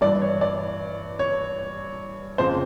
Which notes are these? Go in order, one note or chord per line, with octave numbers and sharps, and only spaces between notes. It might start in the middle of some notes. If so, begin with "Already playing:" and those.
G2 E3 D5
C#5
D5
C#5
F2 C#3 F3 C5